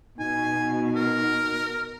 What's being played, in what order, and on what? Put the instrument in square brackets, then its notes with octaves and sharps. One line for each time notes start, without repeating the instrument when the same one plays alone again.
[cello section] B2 [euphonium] D#4 [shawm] G#5
[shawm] A#4